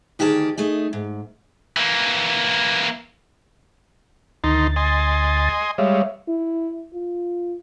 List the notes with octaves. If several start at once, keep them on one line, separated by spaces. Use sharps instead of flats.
D2 D#3 G4 G#4 C#5 A5
A3 D#4 G#4
G#2
E3 A#3
D2 D#3 D#4 C6 A6
D#5 G#5 C6
G3 G#3 C#5 E5 F5
E4
F4